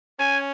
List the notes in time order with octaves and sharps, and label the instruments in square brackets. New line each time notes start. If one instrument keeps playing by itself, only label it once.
[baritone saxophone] C#4 [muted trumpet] G#5